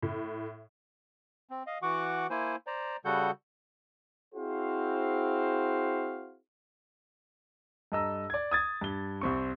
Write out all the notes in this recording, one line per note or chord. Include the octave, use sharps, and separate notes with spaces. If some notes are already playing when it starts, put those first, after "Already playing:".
A2
C4
D#5 F5
E3 F#4 F#5 C#6 D6
A#3 E4 C5 G#5
C5 D5 A#5
C#3 G3 F#4 A4 F#5 G6
C4 E4 F#4 G#4 C5 F5
G2 A4 D#5 A#5 E6
D5 G#6
D#6 G#6 A6
G2 G7
C2 C4 C#6